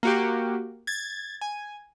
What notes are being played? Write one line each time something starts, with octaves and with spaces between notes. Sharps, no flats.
A#3 F#4 G4
G#6 A6
G#5